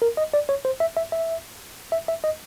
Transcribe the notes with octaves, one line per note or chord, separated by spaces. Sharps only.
A#4
D#5
D5
C#5
C5
E5
E5
E5
E5
E5
D#5